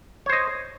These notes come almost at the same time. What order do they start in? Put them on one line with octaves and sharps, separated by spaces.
C#5 C5 D#5